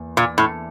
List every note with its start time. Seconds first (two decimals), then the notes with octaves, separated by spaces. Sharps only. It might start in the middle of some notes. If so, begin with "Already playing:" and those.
Already playing: E2 A#3
0.17 A#2
0.38 A2